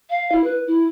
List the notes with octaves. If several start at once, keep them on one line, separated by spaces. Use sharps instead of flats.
F5
E4
B4
E4